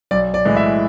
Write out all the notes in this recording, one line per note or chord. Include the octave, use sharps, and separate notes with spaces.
B1 D5
D5
A2 E3 G#3
E5